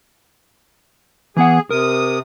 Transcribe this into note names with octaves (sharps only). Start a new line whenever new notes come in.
E3 B3 G#4 F#5
C3 A#4 D#6